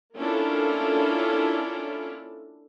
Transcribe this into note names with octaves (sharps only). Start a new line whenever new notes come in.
A#3 C#4 D4 E4 F4 A4